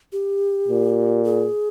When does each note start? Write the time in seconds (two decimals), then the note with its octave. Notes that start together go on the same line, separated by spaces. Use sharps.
0.12 G4
0.68 A#2
1.24 G#4